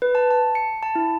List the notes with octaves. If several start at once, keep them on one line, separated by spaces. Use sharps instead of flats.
B4
A5
A5
C#7
A5
E4